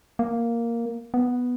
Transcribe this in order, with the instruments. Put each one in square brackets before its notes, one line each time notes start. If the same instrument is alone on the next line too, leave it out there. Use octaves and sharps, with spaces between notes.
[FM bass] A#3
B3